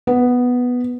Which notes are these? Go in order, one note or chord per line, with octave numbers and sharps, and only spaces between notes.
B3